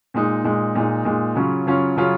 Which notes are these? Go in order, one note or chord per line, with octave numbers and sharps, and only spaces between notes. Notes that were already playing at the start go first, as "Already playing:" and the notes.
A#2 G#3 D#4
A#2 G#3 D#4
A#2 G#3 D#4
A#2 G#3 D#4
C#3 F#3 C#4 F4
C#3 F#3 C#4 F4
C#3 F#3 C#4 F4